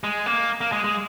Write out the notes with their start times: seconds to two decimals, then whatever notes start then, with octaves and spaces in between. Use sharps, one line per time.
0.04 G#3
0.26 A#3
0.61 A#3
0.72 G#3
0.84 G#3